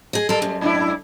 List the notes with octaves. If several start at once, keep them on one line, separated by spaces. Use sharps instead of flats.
G#4 D#5
G3 A4 A#4
F#2
G#2 D4 E4